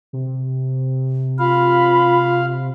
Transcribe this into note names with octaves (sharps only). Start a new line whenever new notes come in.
C3
F4 F5 B5